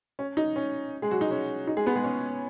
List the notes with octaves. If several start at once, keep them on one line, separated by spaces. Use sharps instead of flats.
C#4
D#4
C#4
G#3 G#4
F#3 F#4
D#4
C#4
D#4
G#3 G#4
B3 B4
G#3 G#4
C#4 C#5